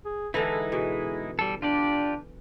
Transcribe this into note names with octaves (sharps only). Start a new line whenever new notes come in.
G#4
D3 E3 G#3 D#4 E4 A4
B2 G#4
G3 A4
D4 F4 G4 D5